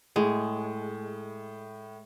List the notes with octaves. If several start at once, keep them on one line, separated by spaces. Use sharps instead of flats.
A2 G#3